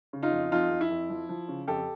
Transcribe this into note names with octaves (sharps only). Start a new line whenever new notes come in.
C#3
D#4 F4
F2
F2 D#4 F4
F2
E4
F2
F3
F3
C#3
F2 G4 A4